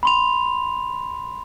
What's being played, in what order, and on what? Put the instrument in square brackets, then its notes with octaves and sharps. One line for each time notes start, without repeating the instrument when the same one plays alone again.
[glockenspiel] B5 C6 F7